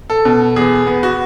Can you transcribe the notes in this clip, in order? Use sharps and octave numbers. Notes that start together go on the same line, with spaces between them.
A4
B2
E2 G#4
B3
F#4